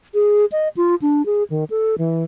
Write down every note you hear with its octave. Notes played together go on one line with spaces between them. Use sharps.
G#4
D#5
F4
D4
G#4
D#3
A4
E3